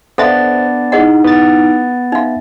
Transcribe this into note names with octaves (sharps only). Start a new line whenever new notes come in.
B3 D4 A4 C5 E5 F5 A6
D#4 E4 G#4 D#5 F#5
B3 A6
D#4 E5 F5